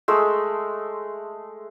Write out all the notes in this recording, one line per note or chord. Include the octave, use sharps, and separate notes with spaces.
G#3 A3 E6